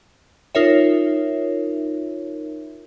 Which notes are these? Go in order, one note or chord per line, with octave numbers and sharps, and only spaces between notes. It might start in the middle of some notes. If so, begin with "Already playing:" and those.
D#4 F4 A#4 C#5 E5